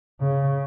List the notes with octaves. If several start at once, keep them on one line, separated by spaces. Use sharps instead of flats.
C#3